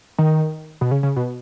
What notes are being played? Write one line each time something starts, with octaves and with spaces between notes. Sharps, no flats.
D#3
B2
C#3
C#3
B2